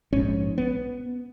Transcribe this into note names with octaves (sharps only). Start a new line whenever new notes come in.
A#1 G#2 C#4
B3